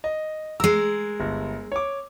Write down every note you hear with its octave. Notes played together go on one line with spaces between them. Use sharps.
D#5
G#3 A#4 E6 C7
G1
C#5 D6